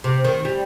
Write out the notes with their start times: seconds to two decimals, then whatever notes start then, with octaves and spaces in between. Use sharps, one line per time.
0.04 C3
0.24 D#3
0.45 G3